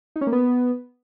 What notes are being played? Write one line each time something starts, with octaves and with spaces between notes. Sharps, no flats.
D#4
C#4
A#3
B3